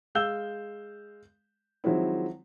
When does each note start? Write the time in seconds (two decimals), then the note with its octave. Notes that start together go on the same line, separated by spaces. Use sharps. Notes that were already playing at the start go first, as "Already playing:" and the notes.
0.15 G#3 F5 E6 G6 G7
1.84 D#3 F3 F#3 G#3 C4 E4